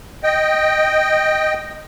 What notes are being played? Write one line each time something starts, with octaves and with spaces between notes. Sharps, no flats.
D#5 G5